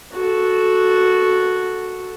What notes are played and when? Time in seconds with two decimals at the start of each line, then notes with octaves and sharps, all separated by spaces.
0.12 F#4 A4